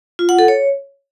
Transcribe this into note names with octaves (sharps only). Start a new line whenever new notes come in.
F4
F#5
A4
C#5